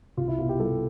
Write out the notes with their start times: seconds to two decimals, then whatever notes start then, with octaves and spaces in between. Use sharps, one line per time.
0.17 C2 F4
0.28 E4
0.39 B2 F4
0.49 G4
0.59 G3 A4